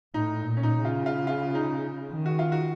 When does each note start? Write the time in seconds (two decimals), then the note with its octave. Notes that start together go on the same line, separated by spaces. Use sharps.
0.14 A2 D#4
0.42 A#2
0.57 C#4
0.63 D#4
0.84 C#3 F4
1.06 F4
1.27 F4
1.55 D#4
2.12 D#3
2.26 F#4
2.39 F4
2.52 F#4